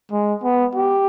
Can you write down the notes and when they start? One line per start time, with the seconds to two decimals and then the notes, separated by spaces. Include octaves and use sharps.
0.12 G#3
0.43 B3
0.75 G4